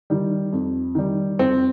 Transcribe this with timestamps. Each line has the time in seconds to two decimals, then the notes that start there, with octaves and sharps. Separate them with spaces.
0.10 D#3 G3
0.53 F2
0.95 D#3 G3
1.39 F2 C4